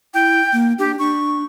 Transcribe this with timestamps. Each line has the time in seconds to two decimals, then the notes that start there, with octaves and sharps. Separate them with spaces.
0.14 E4 G5
0.53 A#3
0.79 D4 G4
0.99 D4 C#6